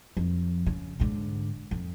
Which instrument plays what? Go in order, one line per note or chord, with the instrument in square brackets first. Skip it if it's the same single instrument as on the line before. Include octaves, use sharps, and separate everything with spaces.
[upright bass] F2
C#3
G#2 D3
F2